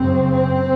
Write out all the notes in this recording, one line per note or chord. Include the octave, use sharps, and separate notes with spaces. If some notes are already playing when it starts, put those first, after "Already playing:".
Already playing: F#2 C#3 C4
C4